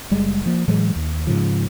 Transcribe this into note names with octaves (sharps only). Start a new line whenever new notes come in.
F#1 G3 G#3
F3 A#3
A2 E3 F#3 G#3
D#2
G#2 C#3 F3